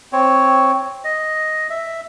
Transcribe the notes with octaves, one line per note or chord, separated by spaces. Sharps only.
C4 C#5
D#5
E5